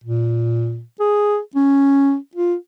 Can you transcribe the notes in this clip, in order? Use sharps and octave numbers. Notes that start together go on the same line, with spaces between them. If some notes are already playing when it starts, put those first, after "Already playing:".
A#2
G#4
C#4
F4